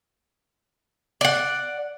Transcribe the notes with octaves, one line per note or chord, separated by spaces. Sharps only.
D5 F#5